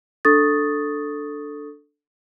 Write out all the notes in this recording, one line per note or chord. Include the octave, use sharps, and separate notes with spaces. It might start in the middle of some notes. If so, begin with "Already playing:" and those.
D4 A4 C#6 D#6 A6